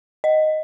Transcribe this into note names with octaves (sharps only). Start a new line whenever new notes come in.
D#5